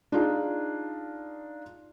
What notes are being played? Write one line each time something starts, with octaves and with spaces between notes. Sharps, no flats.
D4 D#4 F4 G#4